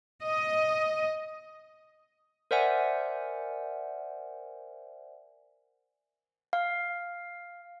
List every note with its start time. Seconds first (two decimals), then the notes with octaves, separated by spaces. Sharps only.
0.23 D#5
2.51 A#4 C5 D5 E5 F#5 G#5
6.53 F5